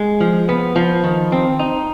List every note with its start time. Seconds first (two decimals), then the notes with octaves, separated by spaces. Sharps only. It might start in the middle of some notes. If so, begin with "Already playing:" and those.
Already playing: G#3
0.20 F3
0.49 B3
0.76 F3
1.04 D#3
1.32 C4
1.59 D#4